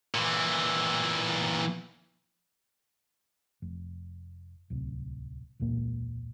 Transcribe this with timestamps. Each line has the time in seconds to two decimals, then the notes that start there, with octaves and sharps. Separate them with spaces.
0.15 A#2 E3
3.62 F1
4.70 D1 C2
5.59 E1 C#2 A#2 A#3